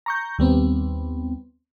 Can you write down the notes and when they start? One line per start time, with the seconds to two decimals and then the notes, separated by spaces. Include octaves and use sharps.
0.06 A#5 C#6 G6
0.39 D#2 G3 B3 C4